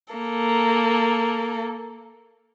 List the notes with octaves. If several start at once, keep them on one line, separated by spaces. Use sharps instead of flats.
A#3 A4